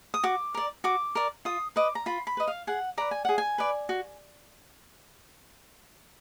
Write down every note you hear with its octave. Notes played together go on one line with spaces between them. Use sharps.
D#6
F#4 D6
A#4 D5
F#4 D6
A#4 D5
F4 D#6
B4 D#5 D6
A#5
F4 B5
B5
B4 D#5
F5
G#4 F#5
B4 D5 A#5
G#5
G#4 F#5
G#5
B4 D5
F#4